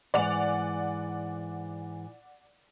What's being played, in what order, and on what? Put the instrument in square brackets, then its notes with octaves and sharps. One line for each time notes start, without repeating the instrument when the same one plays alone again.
[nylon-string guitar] G#2 E3 [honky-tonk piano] D5 F#5 F7